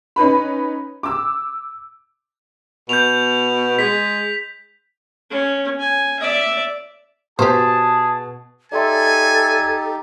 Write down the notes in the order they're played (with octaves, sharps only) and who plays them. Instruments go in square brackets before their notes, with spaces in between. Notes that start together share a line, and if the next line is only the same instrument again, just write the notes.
[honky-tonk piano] C#4 D#4 B4 B5
D6 E6
[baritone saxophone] B2 [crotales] G6 F7
[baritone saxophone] G#3 [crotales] B6
[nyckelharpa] C#4
G#5
D5 E5
[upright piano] B2 [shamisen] G4 C5 [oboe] G#4 [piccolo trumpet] A5
[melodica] D#4 G4 [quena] A4 [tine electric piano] D5 E5 C6 [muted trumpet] G#5